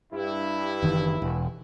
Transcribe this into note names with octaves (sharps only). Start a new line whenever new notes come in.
G2 E4
F#1 D#3 E3
E1